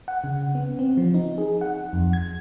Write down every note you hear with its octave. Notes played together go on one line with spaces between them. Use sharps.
F#5
C#3
B3
C4
F3
D#4
G#4
F#5
F2
G#6